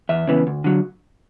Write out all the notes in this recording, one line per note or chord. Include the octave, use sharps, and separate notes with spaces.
E2 E5
C#3 E3 B3
D2
D3 F#3